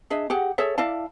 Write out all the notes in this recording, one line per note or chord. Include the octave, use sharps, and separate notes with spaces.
D4 G#4 D#5 E5
G4 G#4 F#5
G#4 A4 C#5 E5
E4 D5 F5 A5